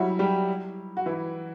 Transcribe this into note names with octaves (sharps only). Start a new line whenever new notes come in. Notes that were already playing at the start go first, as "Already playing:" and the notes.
Already playing: F#3 G3 E4 F#4
G3 G4
F#4
E3 E4